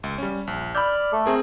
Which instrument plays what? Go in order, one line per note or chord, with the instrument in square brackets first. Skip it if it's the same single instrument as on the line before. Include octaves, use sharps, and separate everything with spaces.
[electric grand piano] C#2
G3 C#4
A#1
[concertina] D5 F6 [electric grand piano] B5 E6 G6
[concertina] A3 A4
[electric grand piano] C4 G#4 A#4